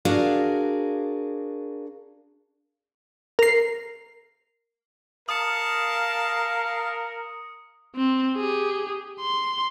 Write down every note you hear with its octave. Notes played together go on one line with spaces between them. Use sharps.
D4 F#4 G#4 A#4 D5 F5
A#4 C7
A#4 F5 A5 D#6 C#7
C4
G4 G#4
C6